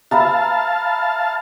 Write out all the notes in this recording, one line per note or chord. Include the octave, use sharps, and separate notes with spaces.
B4 E5 F5 A5 A#5